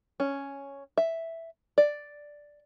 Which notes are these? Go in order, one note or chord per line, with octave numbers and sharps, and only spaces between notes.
C#4
E5
D5